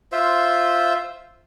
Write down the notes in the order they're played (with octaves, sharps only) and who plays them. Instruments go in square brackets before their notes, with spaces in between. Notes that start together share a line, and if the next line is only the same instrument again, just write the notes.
[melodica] F4 C5 E5